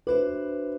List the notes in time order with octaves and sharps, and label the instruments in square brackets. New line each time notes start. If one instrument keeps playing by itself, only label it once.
[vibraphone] D4 F#4 C5 E5 [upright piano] B4